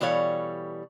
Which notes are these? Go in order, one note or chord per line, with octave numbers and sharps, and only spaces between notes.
B2 E3 G3 A4 C#5 F5